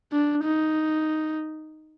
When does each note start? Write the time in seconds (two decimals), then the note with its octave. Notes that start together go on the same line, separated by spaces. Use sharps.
0.12 D4
0.44 D#4